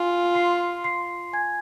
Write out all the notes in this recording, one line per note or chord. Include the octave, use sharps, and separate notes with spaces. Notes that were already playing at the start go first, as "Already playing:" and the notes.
Already playing: F4 G#5
C6 C7
C6 C7
G#5 G#6